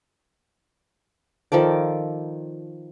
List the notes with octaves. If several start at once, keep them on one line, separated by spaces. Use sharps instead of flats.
D#3 F3 A4 D5